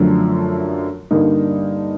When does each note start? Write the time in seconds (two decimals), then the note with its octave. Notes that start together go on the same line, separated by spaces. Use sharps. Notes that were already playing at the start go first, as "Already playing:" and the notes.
Already playing: F#2 D3 F3 A3
1.11 G2 D3 G3 A#3 D#4